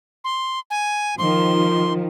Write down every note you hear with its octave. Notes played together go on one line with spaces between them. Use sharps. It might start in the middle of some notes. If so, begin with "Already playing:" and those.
C6
G#5
D#3 F3 C6